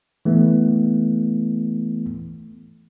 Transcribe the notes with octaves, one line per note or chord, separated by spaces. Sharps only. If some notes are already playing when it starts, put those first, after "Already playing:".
E3 A3 B3